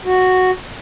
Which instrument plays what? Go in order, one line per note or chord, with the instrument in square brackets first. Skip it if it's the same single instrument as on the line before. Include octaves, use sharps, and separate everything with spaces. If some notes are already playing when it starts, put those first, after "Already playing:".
[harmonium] F#4